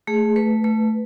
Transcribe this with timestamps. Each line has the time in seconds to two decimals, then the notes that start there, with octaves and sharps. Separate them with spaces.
0.07 A3 G#4
0.36 A3 B4
0.64 A3